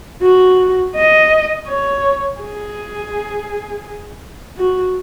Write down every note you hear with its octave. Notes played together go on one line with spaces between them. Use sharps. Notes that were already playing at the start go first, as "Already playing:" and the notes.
F#4
D#5
C#5
G#4
F#4